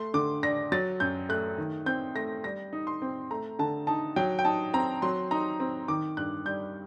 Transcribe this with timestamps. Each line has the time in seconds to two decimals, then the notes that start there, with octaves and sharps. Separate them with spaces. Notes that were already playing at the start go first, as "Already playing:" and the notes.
Already playing: A3 C6
0.14 D3 D6
0.43 D4 A#6
0.72 F#3 A6
1.00 F#2 G6
1.29 A3 F#6
1.58 D#3
1.86 C4 G6
2.15 A3 A#6
2.44 G3 A#6
2.73 D#4
2.87 C6
3.02 C4
3.31 A3 A#5
3.59 D3 A5
3.87 D#4 A5
4.16 F#3 G5
4.39 G5
4.45 D#4 A5
4.73 C4 A#5
5.02 F#3 C6
5.31 D#4 A#5
5.60 C4
5.88 D#3 D6
6.17 G2 F#6
6.45 G3 G6